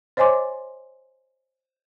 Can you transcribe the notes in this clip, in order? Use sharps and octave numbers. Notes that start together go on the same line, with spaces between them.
C5 C#5 D#5 G#5 C6 D6